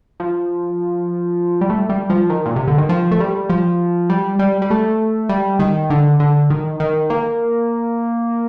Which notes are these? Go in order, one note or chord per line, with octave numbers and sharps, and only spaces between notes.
F3
G3
A3
G3
F3
D#3
A#2
C3
D3
D#3
F3
A3
G3
F3
G3
G3
G3
A3
G3
D#3
D3
D3
D#3
D#3
A#3